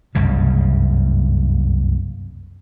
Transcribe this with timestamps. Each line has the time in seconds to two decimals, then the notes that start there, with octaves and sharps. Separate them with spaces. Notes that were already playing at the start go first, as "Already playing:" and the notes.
0.15 F#1 C2 G2 C#3